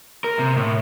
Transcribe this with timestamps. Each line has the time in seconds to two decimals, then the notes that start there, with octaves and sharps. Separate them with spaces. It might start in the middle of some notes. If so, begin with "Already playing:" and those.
0.24 A#4
0.39 C3
0.57 A2